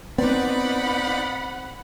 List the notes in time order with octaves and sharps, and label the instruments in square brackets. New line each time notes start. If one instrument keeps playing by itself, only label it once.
[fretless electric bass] B3 [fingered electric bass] C4 [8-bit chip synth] D#4 D5 [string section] F#5 B5